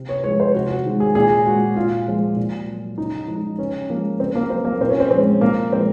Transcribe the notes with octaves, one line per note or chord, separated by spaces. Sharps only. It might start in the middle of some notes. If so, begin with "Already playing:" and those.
Already playing: C3
C#5
F3 G#3 C#5
C5
C3 F#4
F#4
D#3 G#3
G#4
A#2 G#4
G#3 F#4
A#2 F4
F3 G#3
A#2
F#3
C#3 D#4
F3 G#3 D#4
C#3 C#4
F3 G#3 A#3
C#3 C4
A#3
F#3 C4
A#3
A#2 C4
C#4
C4
F3 C4
G#3
A#2 A#3
F3 G#3 C4